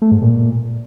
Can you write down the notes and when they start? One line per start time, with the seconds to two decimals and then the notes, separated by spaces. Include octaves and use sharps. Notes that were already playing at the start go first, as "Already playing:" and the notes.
0.02 A3
0.12 G#2
0.22 A#2